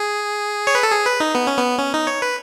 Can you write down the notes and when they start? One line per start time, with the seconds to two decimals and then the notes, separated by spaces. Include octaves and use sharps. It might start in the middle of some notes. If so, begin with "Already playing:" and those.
Already playing: G#4
0.67 C#5
0.75 B4
0.83 A4
0.92 G#4
1.06 B4
1.20 D#4
1.35 B3
1.47 C#4
1.58 B3
1.79 C#4
1.94 D#4
2.07 C#5
2.22 B4